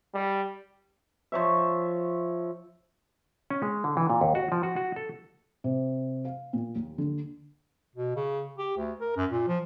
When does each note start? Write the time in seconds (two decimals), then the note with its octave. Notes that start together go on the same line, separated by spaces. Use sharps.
0.14 G3
1.32 F3 C#5 E5
3.50 C#4
3.62 G#3
3.84 D3
3.97 E3
4.10 A#2
4.21 D#2
4.35 F#4
4.52 F3
4.63 F#4
4.76 F#4
4.96 A4
5.64 C3
6.25 F5
6.53 A#2
6.75 D#2
6.98 D3
7.96 B2
8.16 C#3
8.58 G4
8.77 D2
9.01 A#4
9.16 F#2
9.31 A#2
9.48 F3